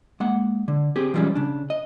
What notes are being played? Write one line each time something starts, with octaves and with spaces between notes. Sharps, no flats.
G#3 A#3 F#5
D3
C4 G4 G#4
E3 F3 G3 G#3 C#4
C#3 D4
D#5